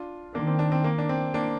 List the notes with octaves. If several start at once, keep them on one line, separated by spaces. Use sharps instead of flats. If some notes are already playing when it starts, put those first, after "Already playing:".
Already playing: D4 F4
D#3 A#3 D4
C4
A#3 D4
C4
A#3
D4
C4
A#3 D4